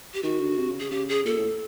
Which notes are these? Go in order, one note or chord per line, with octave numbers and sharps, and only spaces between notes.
G4
D#3 F#4
D3
C3
C#3
C#3 G#4
C#3 G4
G#4
A#2 A4
A2